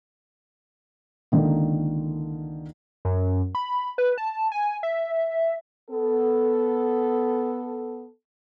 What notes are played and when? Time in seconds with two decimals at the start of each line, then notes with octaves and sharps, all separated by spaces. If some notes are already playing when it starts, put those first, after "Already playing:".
1.32 C#2 D3 D#3 A#3
3.05 F#2
3.55 B5
3.98 B4
4.18 A5
4.52 G#5
4.83 E5
5.90 B3 A4